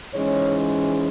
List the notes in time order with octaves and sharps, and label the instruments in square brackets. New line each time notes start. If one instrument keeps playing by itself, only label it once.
[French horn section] G#2 E3 G#3 C#4 C#5